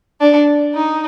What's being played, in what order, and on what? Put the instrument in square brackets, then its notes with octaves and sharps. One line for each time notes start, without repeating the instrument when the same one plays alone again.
[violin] D4
D#4